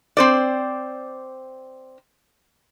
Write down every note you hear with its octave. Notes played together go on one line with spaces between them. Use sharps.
C4 C5 D5